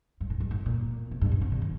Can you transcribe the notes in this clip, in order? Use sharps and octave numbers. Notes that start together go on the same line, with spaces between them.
G2
A2
G2
A2
A#2
C3
G2
A#2
C3
D3
D#3